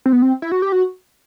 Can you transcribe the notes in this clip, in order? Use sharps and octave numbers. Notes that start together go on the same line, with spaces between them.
C4
B3
C4
E4
F#4
G4
F#4